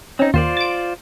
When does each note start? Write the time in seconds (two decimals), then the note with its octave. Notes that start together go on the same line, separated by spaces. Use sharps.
0.19 C4 C#4 D#4
0.34 D#2 F4 C5 D5
0.57 A6 D7